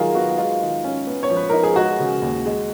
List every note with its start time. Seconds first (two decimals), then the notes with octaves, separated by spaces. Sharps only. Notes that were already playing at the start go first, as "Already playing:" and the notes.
Already playing: D#3 F#3 F4 F#4 G#4 A#4
0.15 B3 F#4
0.38 G#3 F4
0.60 D#3
0.84 C#4
1.07 B3
1.23 C#5
1.30 F3
1.37 B4
1.49 D#4 A#4
1.63 G#4
1.76 G#3 F#4
2.00 C#3
2.22 D#2
2.46 G#3